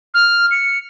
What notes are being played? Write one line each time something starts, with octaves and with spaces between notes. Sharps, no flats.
F6
C#7